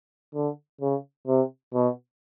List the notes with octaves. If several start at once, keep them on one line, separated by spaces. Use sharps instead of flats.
D3
C#3
C3
B2